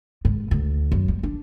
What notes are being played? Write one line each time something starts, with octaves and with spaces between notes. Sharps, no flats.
G#2
D2
F#2
G3
D4